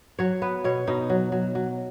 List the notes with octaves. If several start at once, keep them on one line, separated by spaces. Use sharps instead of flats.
F#3 C#5
B3 B4
B2 C#5
B2 D#4
F#3
F#3
F#3